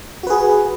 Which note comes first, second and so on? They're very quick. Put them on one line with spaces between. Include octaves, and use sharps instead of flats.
F#4 B4 G#4